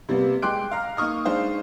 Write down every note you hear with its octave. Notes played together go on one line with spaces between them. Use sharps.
C3 G3 A#3 B3
G#3 G5 C6 D6 F#6 D7
F5 A#5 F6
A#3 D#4 C#6 D#6 F6
G#3 D4 D#4 C5 F5